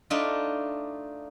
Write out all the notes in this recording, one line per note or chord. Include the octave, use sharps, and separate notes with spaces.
A3 D4 D#4 F4